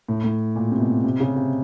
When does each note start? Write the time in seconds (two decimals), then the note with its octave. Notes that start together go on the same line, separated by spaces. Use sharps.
0.09 A2
0.24 A2
0.56 A#2
0.71 C3
0.80 B2
1.04 C3
1.20 C#3
1.36 C3